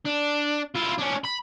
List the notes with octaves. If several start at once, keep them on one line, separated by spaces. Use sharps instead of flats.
D4
E4 F4
C#4 D4
B5